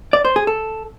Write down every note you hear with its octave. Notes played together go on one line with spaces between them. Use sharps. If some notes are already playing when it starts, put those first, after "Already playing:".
D5
C5
G#4
A4